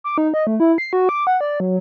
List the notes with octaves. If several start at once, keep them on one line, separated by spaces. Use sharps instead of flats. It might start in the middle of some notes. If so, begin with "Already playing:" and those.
D6
D#4
D#5
A3
E4
C7
F#4
D6
F#5
D5
F#3